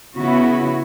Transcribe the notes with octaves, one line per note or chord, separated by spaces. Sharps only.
C#3 B3 E4 F#4